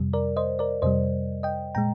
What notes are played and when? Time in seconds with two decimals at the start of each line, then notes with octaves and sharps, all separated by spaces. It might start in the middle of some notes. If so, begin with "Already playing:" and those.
Already playing: F2 C3 G3
0.13 A#4 D5
0.37 C5 D#5
0.59 A#4 D5
0.82 F2 C3 G3 C5 D#5
1.43 D#5 G5
1.75 A#2 G#3 G5 A#5